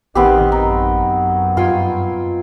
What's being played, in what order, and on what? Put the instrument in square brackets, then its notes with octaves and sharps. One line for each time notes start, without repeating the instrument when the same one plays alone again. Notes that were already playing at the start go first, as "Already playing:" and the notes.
[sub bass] A1 [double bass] D#3 [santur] B3 C4 G4
[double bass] F#2 [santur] D#4
[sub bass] G2 [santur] F4 G5 G#5